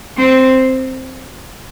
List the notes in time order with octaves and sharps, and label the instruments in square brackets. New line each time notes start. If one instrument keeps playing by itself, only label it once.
[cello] C4